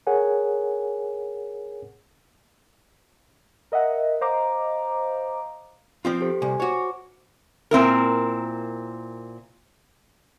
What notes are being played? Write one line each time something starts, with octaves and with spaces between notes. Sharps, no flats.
G#4 A#4 C#5 F#5 G#5
A#4 D#5 E5 F#5
C5 D#5 F5 A#5 D6
F3 C4 F4
G4 A4 C5
C2 G#5
F#4 C5 C#5 D6
A#2 C4 E4 A#4